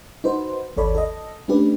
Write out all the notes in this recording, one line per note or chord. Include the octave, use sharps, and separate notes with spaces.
D#4 F#4 B4 C5
G#1 D#2 A4 C#5 D5 B5
A4 D#5
A3 C#4 D4 G4 B4